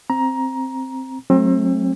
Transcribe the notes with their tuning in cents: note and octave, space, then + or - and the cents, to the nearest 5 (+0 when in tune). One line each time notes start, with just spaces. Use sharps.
C4 +0 A#5 +15
F#3 +0 A3 -15 C4 +35